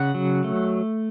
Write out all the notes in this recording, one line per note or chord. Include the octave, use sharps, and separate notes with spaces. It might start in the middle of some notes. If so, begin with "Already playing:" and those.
Already playing: C#3 F#5
F#3
A3